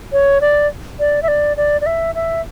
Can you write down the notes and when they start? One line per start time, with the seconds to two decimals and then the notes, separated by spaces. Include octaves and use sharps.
0.13 C#5
0.41 D5
0.99 D5
1.23 E5
1.28 D5
1.57 D5
1.81 D5
1.86 E5
2.15 E5